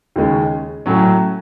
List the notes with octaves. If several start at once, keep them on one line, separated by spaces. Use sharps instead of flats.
D#2 C#3 G#3 C#4
A2 F#3 C#4